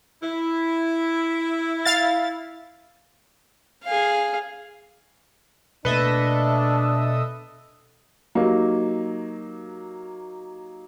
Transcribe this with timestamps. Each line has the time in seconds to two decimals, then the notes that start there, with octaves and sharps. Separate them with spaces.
0.23 E4
1.85 F5 A6
3.85 G#4 F5
5.85 B2 A3 A#3 D4 A4 B4 D#5 E5
8.35 F#3 A#3 D#4 G4